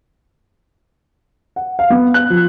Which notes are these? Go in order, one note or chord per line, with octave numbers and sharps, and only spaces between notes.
F#5
F5
B3
F#6
F3